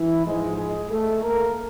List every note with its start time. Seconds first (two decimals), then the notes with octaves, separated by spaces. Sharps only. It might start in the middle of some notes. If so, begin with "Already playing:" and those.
Already playing: E3 E4
0.25 G#2 F3 G#3
0.57 G#3 G#4
0.90 A3 A4
1.22 A#3 A#4